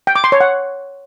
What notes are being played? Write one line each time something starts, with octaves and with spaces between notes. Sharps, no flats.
G5
D6
C6
C#5
F#5